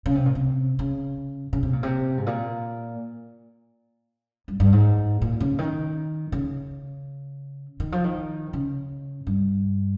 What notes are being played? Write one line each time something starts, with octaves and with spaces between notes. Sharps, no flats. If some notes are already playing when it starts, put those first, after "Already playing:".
C#3
C3
A#2
C3
C#3
C#3
C3
A#2
C3
G#2
A#2
G2
G2
G#2
A#2
C#3
D#3
C#3
D#3
F3
D#3
C#3
G2